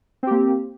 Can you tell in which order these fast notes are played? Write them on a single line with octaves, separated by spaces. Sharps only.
C4 G4 A#3